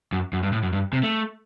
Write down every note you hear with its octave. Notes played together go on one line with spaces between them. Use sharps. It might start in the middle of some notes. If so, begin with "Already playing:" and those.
F#2
F#2
G2
A2
F#2
G2
C3
A3